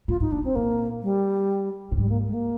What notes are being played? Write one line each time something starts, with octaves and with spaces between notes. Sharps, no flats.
A#2 F4
G#2 D#4
A#2 D4
G2 C4
A#2 A#3
G3
A#2
G#2 G3
A#3
G#3
A#3